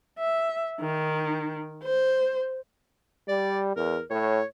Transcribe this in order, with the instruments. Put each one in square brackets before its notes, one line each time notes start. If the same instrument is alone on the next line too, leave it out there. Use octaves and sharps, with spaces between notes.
[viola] E5
D#3
C5
[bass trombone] G3 [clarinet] D5
[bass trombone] E2 [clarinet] A#4
[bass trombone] A2 [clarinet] C#5